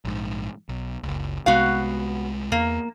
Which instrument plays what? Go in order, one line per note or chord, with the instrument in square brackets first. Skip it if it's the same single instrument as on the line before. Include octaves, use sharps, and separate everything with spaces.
[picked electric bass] A#1 G#2
B1
F#1 C#2
[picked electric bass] C2 C3 G#3 [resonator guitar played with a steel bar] B3 F#4 F5
[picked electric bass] E2 [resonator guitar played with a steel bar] A#3